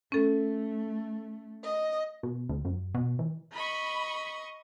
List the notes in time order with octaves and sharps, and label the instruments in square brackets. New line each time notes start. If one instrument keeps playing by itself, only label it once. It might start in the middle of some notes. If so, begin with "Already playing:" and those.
[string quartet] A3 [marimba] C#4 A4
[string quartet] D#5
[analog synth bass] B2
D2
F#2
B2
E3
[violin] D#5 C#6 [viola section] B5